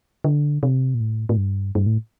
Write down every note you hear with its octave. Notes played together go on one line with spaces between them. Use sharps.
D3
C3
A#2
A2
A2
G2
G2
A2